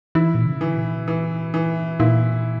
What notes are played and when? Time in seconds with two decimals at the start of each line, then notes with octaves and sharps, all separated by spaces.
0.15 E3 E4
0.35 A#2
0.46 C#3
0.61 D3 E3
0.70 C#3
0.77 A#2
1.08 E3
1.54 E3
1.99 A#2 E4